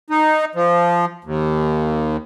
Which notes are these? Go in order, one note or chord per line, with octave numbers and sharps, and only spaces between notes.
D#4
F3
D#2